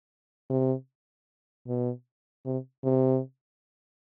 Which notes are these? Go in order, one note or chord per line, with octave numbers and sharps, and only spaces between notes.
C3
B2
C3
C3